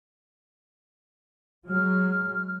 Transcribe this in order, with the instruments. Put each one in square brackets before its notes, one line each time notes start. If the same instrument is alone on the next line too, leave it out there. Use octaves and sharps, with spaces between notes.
[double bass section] F#3 G#3 [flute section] F6